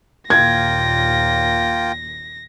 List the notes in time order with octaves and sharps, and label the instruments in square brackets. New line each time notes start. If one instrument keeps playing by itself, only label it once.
[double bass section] D#2 A#2 [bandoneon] A#3 F4 G5 [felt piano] G#6 [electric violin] A#6